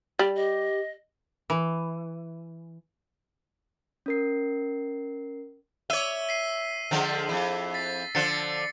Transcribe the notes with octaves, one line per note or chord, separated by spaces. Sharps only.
G3 D5
G4 D#5
E3
C#4 A#4 C7
C#5 E5 E6 D#7 G7
B6 C7 D#7
D3 F3 G#3
F2 E4
A6 B6 C7
D3 F3 A6 C7 C#7